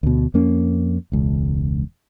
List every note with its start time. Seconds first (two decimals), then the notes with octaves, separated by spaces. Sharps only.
0.03 D2 B2
0.34 F2 A#3 C#4
1.12 E1 C#2